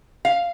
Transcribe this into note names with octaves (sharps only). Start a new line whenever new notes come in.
F5